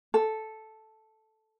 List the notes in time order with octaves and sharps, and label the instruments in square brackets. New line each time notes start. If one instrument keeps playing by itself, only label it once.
[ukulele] A4